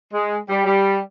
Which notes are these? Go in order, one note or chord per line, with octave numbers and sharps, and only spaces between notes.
G#3
G3
G3